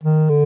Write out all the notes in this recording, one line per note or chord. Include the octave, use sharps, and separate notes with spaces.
D#3
D3